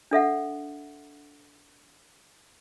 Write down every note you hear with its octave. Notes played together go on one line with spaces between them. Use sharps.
D4 A4 E5 F#5